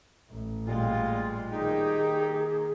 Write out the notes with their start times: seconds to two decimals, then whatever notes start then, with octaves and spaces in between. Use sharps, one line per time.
0.30 A1
0.67 A#2 G3 G#3 F4
1.51 D#3 A#3 D#4 G4 G#4